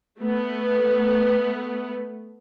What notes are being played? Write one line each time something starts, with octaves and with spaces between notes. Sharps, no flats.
A3 B3